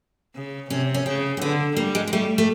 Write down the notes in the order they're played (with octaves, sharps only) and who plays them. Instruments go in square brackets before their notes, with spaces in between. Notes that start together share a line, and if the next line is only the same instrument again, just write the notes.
[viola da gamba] C#3
[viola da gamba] C3 [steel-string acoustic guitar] C#4
[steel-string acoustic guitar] C#4
[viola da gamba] C#3 [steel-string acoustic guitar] C4
[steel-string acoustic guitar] C4
[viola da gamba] D3 [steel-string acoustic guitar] B3
[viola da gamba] G3 [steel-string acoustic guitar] A#3
[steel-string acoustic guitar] G#3
G#3
[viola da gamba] G3 [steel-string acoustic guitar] A3
[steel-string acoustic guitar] A3